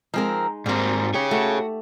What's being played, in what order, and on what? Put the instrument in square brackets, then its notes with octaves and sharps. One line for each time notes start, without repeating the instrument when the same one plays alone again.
[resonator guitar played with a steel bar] F3 C4 A#4 [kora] G#3 D#4
[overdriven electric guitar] G#2 C4 [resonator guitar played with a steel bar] G3 A#3
[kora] G4 [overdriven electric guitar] G#4 C#5
[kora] A3 [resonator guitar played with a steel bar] F#4